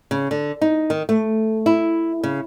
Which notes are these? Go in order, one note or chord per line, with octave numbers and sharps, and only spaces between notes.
C#3
D3
D#4
D#3
A3
E4
C#3